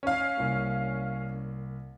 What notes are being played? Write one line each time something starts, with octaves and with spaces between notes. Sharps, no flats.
C#4 F5
C2 A#3